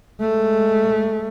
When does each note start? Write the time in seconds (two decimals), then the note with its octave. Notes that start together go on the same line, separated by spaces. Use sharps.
0.21 G#3 A3